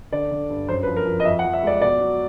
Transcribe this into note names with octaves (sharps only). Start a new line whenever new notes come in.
D3 D5
D3
G2
F#2 C5
B4
F3
A#4
F3
D#5
F2 E5
F#5
F3
E5
G#3 D5
B2 D5
F#3